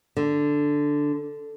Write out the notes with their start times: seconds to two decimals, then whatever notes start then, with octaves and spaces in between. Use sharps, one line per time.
0.17 D3